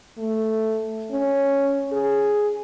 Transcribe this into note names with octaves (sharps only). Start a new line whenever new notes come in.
A3
C#4
G#4